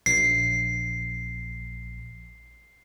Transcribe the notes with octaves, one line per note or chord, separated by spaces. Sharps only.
A#1 C7